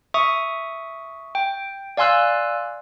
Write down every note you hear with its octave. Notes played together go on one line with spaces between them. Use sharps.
E5 C#6 D#6
G5
D5 F5 G#5 C6 E6 F#6